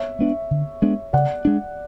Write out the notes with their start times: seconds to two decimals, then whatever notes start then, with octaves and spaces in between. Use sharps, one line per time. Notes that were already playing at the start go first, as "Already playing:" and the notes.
Already playing: C#5 E5
0.19 G#3 B3 D4
0.51 D3
0.82 G#3 B3 D4
1.13 C#3 D5 F#5
1.45 G#3 D4